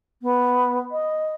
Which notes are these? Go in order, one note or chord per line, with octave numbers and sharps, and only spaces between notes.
B3
D#5